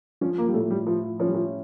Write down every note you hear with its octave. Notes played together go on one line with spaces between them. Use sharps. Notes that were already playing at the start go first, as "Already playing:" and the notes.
F3 C#4
A#3
G3
A2 A3
G3
F3 E4
F3 C#4
G3
F3